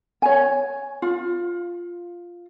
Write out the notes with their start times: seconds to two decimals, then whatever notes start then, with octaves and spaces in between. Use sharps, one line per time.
0.22 C#5 G#5
1.02 F4